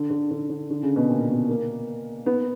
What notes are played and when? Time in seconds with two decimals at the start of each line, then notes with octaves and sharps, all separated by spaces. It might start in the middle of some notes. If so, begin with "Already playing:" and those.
Already playing: D3
0.10 D3
0.31 D3
0.50 D3
0.70 D3
0.83 C#3
0.96 B2
1.09 A#2
1.28 B2
1.49 A#3
2.26 B3